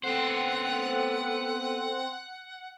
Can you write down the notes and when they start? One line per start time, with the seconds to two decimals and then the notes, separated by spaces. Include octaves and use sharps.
0.04 B3 C4 A4 C5 F#5